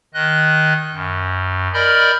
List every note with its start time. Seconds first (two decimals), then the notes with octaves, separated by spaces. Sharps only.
0.14 D#3 D#5 F#6
0.93 F#2
1.74 A#4 D5 D#5 B5 F6 G6